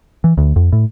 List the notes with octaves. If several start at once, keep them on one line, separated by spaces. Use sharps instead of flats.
E3
D2
F2
A2